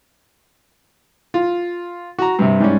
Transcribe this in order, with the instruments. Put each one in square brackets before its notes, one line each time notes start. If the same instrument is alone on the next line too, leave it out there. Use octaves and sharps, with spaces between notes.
[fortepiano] F4
F#4 A#5
G2 C3
G#2 G3 C#4